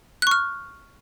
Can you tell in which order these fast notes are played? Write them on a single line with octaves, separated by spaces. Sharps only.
F#6 C#6 F6